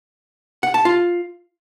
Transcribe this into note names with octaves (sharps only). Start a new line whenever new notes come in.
F#5
A5
F4